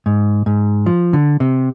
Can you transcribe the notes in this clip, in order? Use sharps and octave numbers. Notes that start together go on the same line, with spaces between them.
G#2
G#2
F3
D3
C3